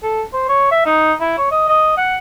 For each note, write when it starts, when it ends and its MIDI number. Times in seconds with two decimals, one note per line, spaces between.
0.03 0.22 69
0.33 0.46 72
0.49 0.67 73
0.71 0.82 76
0.86 1.13 63
1.20 1.36 64
1.38 1.50 73
1.51 1.66 75
1.68 1.95 75
1.97 2.18 78